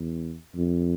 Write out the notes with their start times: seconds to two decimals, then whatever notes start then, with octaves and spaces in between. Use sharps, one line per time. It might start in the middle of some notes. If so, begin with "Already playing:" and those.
Already playing: E2
0.56 F2